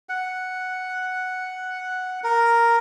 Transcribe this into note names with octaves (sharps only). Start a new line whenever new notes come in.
F#5
A#4